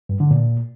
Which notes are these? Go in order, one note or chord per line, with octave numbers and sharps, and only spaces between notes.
G2
D3
A#2